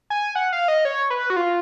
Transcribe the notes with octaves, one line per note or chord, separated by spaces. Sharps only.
G#5
F#5
F5
D#5
C#5
B4
F#4
F4